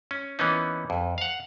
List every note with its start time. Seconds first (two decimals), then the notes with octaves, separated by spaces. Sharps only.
0.11 C#4
0.39 E3 A#3 B3 C#4 D#4
0.90 F2
1.18 F5 F#5